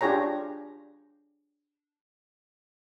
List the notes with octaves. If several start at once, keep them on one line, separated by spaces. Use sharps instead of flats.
D4 F4 G4 G#4 C#5 A#5